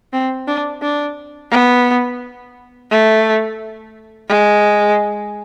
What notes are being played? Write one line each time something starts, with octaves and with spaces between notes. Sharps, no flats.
C4
D4
D4
B3
A3
G#3